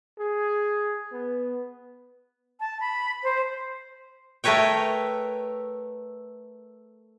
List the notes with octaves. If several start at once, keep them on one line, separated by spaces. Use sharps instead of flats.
G#4
B3
A5
B5
C5
A3 A#4 B4 C#5 G5